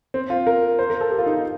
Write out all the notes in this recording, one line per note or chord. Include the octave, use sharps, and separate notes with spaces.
C4
F4
A#4
C5
A#4
A4
G4
F4
D#4
F4